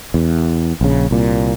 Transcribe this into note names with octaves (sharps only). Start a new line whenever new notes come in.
E2
A#1 C#3
C2 A#2